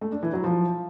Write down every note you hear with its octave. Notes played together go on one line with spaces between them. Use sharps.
A3
D4
E3
F#3
F3